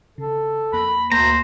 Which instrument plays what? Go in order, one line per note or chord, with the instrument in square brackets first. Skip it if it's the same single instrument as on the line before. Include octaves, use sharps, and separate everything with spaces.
[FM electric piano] C#3 [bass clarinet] A4
[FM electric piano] F2 A#3 A#6 [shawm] B5
[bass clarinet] D2 [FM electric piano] A#3 A5 B6 [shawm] C5 [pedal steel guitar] A#5